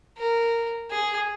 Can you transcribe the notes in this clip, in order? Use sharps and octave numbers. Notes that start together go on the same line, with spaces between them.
A#4
G#4